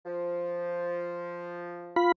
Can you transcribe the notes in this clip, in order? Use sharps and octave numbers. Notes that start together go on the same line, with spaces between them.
F3
F4 B5